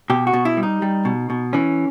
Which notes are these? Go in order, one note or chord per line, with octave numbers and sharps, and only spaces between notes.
B2 G4
F#4
B2
E4
G3
D#4
G3
B2
B2
E3 C#4